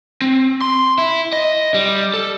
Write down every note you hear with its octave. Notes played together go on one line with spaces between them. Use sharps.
C4
C6
E4
D#5
G3
A4